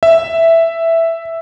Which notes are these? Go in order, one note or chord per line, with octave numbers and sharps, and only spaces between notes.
E5